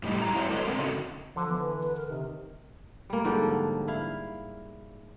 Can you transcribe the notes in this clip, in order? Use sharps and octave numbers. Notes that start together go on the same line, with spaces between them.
A2 G3 D#4
G3 E4 A#5
C4 E4 F#4 C5 C#5
G#3 A4 B4 C#5 D#5
D3 A3 C4 A#4
C#3 C#4 D#4 F#4 A4
D3 F3
E3 B3
B4
B4
A#4
C3 D#3
G3 A#3
G#2 D3 F3 G3
E4 F5